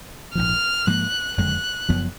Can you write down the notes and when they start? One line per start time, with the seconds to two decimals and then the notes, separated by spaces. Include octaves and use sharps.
0.35 A#1 G#2 F3 F6
0.87 G#2 F3 A#3 F#6
1.37 F#1 F2 D3 G#3 F#6
1.89 F#1 F#2 F3 B3